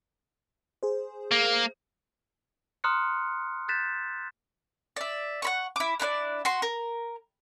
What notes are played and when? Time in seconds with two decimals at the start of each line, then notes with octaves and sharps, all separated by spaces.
0.83 G#4 C5
1.32 A#3
2.84 A#5 C6 D#6 F6 F#6 C#7
3.68 F#6 G6 A6 B6 E7
4.96 D5 E5
5.42 F#5 B5 C#6
5.76 E4 D6
5.99 D4 E4 B4 D5
6.45 F#4 C6
6.62 A#4